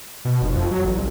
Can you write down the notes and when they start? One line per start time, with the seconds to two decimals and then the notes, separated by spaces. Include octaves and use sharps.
0.25 B2
0.42 F1
0.54 F2
0.71 F#3
0.85 A1
0.97 C2